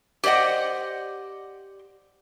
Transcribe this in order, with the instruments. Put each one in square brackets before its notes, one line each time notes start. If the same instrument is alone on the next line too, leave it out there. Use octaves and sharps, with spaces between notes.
[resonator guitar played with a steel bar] G4 C5 D5 D#5 F#5